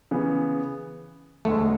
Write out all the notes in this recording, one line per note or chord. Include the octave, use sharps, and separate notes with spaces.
C#3 E3 B3
E1 D2 D3 G#3 A3